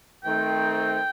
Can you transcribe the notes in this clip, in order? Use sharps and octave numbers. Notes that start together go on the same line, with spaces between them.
D#3 A3 C4 G5